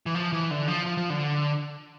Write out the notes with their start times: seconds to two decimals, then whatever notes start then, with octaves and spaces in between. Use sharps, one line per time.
0.06 E3
0.15 F3
0.33 E3
0.51 D3
0.68 F3
0.86 F3
0.97 F3
1.10 D3